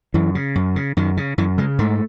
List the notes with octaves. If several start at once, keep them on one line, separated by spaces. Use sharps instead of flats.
F#2 E3
C#3
F#2
C#3
F#2 D#3
C#3
F#2 E3
C#3 G#3
G#2 A3